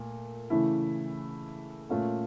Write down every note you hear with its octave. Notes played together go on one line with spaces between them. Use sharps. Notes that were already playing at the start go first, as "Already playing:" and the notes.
Already playing: A#2 A3
C#3 E3 A3 E4
A#2 A3 C#4 F4 A4